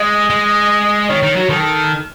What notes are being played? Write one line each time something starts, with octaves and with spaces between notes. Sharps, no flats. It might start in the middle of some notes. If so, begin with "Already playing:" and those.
Already playing: G#3 D#5
G#3
D#3 C#5
D#3
F#3
D#3 A4